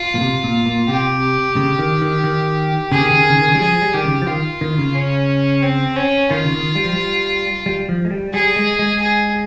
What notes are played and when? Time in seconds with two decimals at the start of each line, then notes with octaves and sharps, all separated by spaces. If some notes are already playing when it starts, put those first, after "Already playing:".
Already playing: F4
0.15 A#2
0.21 C3
0.44 A#2
0.66 A#2
0.88 C3 G4
1.56 C#3
1.79 D#3
2.02 D#3
2.24 D#3
2.92 C#3 G#4
3.01 D#3
3.11 C#3
3.20 D#3
3.29 C#3
3.39 D#3
3.48 C#3
3.54 G3
3.60 F3 G#4
3.82 G3
3.93 D#3 G4
4.05 C#3
4.22 F3
4.27 D#3 F4
4.61 D#3
4.78 C#3
4.95 C#4
5.62 C4
5.96 C#4
6.30 D#3 F4
6.44 C#3
6.53 D#3
6.75 G3
6.85 F3
6.93 G3
7.66 G3
7.89 F3
8.05 G#3
8.11 G3
8.33 G3 G#4
8.56 G#3
8.79 G#3
9.01 G#4